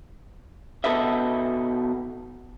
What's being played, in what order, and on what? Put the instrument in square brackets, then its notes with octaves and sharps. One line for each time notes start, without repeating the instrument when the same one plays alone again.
[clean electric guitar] B2 A4 B4 D#5 E5